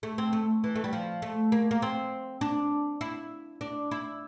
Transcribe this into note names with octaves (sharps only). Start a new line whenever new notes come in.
A3
C4
A3
E3
A3
G3
F3
A3
A#3
A#3
C4
D4
E4
D4
E4